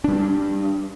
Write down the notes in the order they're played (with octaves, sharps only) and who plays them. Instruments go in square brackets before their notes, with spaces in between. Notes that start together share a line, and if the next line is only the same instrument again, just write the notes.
[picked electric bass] G3 D4